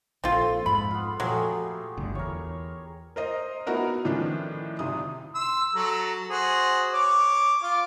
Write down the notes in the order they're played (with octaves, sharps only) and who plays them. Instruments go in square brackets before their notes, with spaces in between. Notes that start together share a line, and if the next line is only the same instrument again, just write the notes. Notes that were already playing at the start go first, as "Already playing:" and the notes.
[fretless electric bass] A#1 A#2 [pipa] C4 F4 [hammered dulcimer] A4
[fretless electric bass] F2 G#2 [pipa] B5
[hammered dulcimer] B3 F4
[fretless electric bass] A#2 F3 [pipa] F#3 [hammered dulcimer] A3 G4 G#4
[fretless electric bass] D1 G1 D3
[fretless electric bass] E2 [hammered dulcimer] A#4 C#5
[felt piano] A#4 C5 D#5
B3 D#4 E4 F#4 A#4 F#5
A2 D#3 F3 C#4 D4
G#1 C3 D#6
[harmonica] C6 E6
F#3 A4 A#5
F#4 G#4 C5
C#5 D6
F4 F5 D6